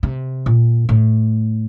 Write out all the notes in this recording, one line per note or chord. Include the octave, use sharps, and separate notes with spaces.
C3
A#2
A2